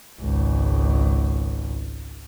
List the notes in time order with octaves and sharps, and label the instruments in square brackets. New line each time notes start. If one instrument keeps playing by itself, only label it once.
[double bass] G#1 C#2